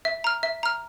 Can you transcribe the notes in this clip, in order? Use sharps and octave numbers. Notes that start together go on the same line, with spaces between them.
E5
A#5 F6
E5
A#5 F6